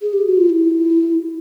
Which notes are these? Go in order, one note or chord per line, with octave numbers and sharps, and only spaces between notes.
G#4
G4
F#4
F4
E4